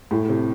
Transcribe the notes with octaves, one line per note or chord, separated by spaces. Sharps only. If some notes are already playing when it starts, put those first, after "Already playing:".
A2
C3